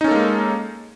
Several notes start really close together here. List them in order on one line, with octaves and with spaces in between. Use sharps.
D#4 C#4 A4 A#3 G#3